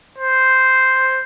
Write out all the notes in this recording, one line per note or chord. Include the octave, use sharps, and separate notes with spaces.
C5